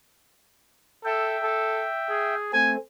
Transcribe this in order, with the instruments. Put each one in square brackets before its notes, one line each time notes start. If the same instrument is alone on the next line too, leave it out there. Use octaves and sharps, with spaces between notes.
[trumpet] A4 [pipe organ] E5 G5
[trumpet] A4
G#4
[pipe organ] A3 C4 [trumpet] G#5